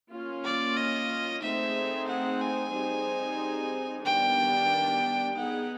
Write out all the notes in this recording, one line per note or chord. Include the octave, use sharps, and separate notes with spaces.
A#3 C#4 F4
D5
D#5
A3 C4 D#4 G#4 C5 E5
F#5
G#5
G3 C4 D#4 G#4 C5
D#3 G3 B3 D4 G5
B3 D#4 G#4 F#5